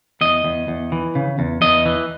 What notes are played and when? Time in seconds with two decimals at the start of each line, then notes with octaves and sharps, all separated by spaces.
0.21 E2 D#5
0.44 E2
0.68 E2
0.92 E3
1.15 C#3
1.39 E2
1.61 E2 D#5
1.86 E3